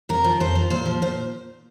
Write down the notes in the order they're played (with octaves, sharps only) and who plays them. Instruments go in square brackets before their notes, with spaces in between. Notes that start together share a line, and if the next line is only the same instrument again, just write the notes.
[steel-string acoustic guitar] F2 A#4
F3
F2 C5
F3
A#2 C5
F3
A#2 C5